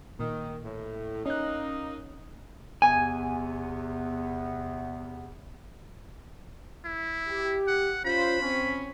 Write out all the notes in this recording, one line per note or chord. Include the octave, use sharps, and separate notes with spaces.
A#2 D#3
A2
A#3 C#4 D#4 F#6
E2 C3 B3 G#5
E4
G4
F#5
C#4 F4 C5 B5
C4 C#4